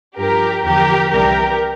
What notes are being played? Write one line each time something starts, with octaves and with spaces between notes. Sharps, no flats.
G2 F3 G4 A#4
E2 D3 F3 G4 A#4
C2 C3 E3 G3 G4 A#4